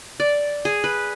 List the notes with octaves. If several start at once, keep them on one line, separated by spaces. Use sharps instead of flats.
D5
G#4
B4